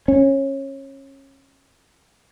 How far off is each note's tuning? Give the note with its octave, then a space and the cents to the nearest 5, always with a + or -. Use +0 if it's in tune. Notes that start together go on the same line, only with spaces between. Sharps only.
C#4 -25